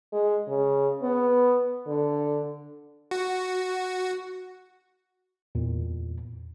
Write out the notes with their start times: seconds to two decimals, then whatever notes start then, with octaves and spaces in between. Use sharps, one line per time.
0.13 G#3
0.48 C#3
1.03 B3
1.87 D3
3.11 F#4
5.55 E2 A#2